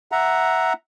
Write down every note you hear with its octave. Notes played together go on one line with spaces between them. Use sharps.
E5 F#5 A#5